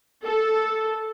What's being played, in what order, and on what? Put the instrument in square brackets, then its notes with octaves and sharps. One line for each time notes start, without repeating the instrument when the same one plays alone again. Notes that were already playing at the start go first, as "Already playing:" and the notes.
[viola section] A4